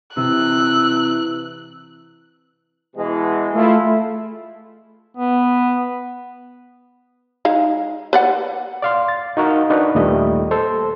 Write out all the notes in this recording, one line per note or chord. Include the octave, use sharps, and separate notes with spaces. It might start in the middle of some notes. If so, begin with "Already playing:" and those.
C3 E3 E6 F#6
B2 E3 G#3
A3 E4 F4
B3
G#3 D#4 F5
B4 D5 F#5
D5 F5 C6
A6
D#4 F#4 A#4 F5
D4 D#4 F#4 A#4 B4 D5
D#2 A#2 G3 A3 D#5
A4 C5